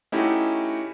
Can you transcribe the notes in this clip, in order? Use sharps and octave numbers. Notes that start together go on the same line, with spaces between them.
A3 C#4 D#4 E4 F#4 G4